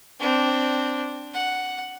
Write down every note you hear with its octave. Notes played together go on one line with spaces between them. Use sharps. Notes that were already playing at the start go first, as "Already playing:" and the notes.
C4 D4
F#5